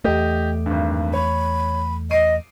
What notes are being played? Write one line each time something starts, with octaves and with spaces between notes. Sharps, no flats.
E2 A3 G4 D#5
G#1 G2
C#5 B5
D#5 C7 D7 D#7